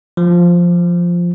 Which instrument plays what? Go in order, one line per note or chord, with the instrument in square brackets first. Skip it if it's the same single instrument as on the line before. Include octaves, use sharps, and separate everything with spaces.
[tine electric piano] F3